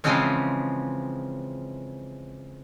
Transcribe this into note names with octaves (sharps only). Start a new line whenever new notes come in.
C#3 E3 F3 G#3 C4 C#4